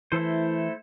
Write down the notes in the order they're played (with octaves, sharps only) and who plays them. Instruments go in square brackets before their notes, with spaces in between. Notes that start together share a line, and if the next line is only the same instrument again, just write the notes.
[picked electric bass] E3 [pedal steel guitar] A3 E4 A4 C5